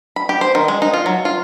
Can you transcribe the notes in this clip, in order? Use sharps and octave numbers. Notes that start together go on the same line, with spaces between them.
B5
G4
C5
D#3
G#3
D#4
F4
F#3
F4